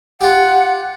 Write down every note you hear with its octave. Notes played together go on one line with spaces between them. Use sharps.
F4 G4 F#5